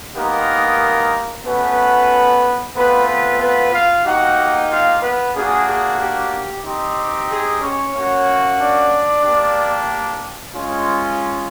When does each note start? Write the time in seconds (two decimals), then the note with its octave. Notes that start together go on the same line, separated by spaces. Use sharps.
0.15 G#3 A#3 B3 D#4 G4 A#4
1.45 A3 B3 C#4 F#4 B4
2.75 A3 B3 C4 F4 B4
3.07 B3 B4
3.40 B3 B4
3.72 F4 F5
4.04 A#3 D#4 F#4 G4 F#5
4.69 F4 F5
5.02 B3 B4
5.34 A#3 D4 F#4 G#4
5.67 G#4
5.99 G4
6.64 C4 D#4 G4
7.29 G#4
7.61 C#4 C#5
7.94 A#3 C#4 F#4
8.58 D4 D5
9.23 A#3 D4 G4
10.53 G#3 C#4 F4